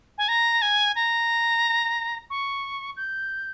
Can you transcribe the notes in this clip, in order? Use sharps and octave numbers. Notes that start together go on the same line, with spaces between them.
G#5
A#5
G#5
A#5
C#6
G6